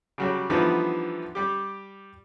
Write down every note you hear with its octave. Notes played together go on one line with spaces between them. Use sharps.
C#3 F#3 G3
D3 E3 F3 G3 B3 D#4
G3 G4